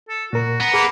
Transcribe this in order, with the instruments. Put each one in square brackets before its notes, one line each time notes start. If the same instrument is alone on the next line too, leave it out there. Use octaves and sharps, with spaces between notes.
[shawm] A4
[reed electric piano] A#2 A#4 [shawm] F#4
[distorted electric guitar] B3 [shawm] A#5
[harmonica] A#3 B4 [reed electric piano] G#4